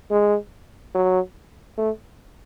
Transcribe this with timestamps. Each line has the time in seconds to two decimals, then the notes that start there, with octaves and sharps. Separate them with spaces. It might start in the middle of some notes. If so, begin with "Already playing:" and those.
0.11 G#3
0.95 F#3
1.78 A3